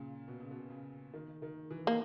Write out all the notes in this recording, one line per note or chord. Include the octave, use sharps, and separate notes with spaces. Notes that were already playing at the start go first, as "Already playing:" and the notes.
Already playing: A#2 C#3
B2
C#3
B2
C#3
D#3
D#3
E3
A#3